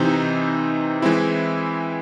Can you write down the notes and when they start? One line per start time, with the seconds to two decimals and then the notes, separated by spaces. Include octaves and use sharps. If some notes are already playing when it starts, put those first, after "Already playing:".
Already playing: C3 E3 C4 D#4
1.02 E3 G#3 C4 E4